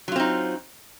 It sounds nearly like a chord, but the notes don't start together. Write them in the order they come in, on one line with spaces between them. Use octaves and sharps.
F#3 F4 C4 D#4